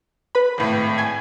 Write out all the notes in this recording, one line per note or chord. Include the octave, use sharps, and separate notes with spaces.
B4 B5
G#1 A2
G#5 G#6